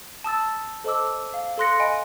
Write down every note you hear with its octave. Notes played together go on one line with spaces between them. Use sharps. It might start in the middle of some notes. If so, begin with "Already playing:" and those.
A5 D#6 E6 A6
A4 C5 D#5 A5 D6 E6
F5
A4 F5 C6 F#6 A#6 C#7
D#5 F5 G#5 B5 D7